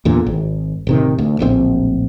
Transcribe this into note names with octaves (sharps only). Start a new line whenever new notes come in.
E2 A#2 D3
G#1
D1 C3 D#3
D2
D1 A#1 B2 C4